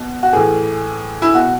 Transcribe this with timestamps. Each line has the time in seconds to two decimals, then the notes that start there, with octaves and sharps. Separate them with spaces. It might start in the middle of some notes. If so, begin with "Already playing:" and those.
Already playing: B2
0.23 F#4
0.33 A2 E3 G#4
1.22 E4
1.35 B2 F#4